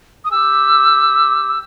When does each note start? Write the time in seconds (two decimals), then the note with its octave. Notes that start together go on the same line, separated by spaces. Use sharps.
0.25 D#6
0.31 G4 E6